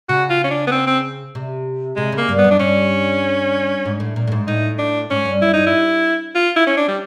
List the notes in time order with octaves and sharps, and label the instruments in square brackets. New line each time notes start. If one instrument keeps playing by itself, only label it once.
[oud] C#3 [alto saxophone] F#4
[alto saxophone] F4
C#4
D4
B3
C4
C4
[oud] C3
[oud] C3 [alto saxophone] G#3
[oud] C#3
[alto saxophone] A#3
[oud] G2
[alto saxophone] B3
[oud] F#2
[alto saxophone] D4
[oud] G2 [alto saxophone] C#4
[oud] G#2
A2
A#2
A2
G#2
[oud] A2 [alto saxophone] D#4
[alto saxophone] D4
[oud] G#2 [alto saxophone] C#4
[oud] G2
[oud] F#2 [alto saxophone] E4
[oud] G2 [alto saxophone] D#4
[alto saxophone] E4
F4
E4
C#4
D4
G3